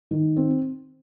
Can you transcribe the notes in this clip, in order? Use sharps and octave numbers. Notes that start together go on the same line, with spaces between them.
D#3
C4